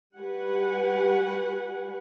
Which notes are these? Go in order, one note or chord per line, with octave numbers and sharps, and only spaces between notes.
G3 F#4 G4 B4 F#5 G#5